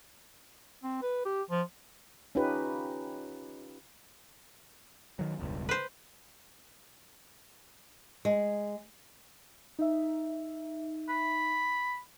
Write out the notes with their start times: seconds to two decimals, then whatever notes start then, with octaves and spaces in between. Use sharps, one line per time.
0.84 C4
1.02 B4
1.25 G4
1.50 F3
2.35 C#4 D#4 F4 G4 B4
5.19 D#3 F#3
5.39 E1 C#2 G2
5.69 B4 C5
8.25 G#3
9.79 D#4 E5
11.08 B5